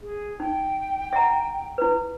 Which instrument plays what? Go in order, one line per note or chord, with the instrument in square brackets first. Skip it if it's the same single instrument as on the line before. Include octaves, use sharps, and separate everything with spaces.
[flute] G#4
[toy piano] D#4 [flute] G5
[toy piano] E5 F#5 A#5
E4 B4